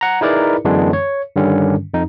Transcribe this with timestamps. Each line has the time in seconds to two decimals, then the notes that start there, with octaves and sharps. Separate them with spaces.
0.01 F#5 A#5
0.21 D#4 E4 G#4 A#4 B4 D5
0.65 F#2 D3 E3 G#3 B3 D4
0.93 C#5
1.36 G2 D3 D#3 G3 C#4
1.94 F2 D#4